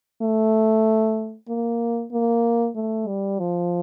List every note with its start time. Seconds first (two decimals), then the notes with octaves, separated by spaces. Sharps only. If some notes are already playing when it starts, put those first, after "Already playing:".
0.22 A3
1.49 A#3
2.12 A#3
2.76 A3
3.08 G3
3.39 F3